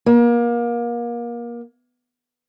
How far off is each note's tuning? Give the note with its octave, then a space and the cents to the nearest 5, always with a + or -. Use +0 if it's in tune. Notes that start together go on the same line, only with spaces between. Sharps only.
A#3 +30